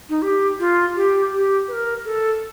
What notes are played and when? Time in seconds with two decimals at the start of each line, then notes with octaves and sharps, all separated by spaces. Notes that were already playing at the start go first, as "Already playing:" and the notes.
0.09 D#4
0.22 G4
0.59 F4
0.96 G4
1.32 G4
1.68 B4
1.72 A#4
2.05 A4